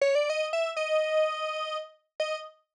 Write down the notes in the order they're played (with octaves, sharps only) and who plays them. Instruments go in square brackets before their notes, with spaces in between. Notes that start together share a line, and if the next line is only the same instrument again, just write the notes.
[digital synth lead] C#5
D5
D#5
E5
D#5
D#5